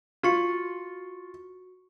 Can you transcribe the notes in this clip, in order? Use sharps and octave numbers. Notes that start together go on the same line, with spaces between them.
F4 F#4 C#6 C#7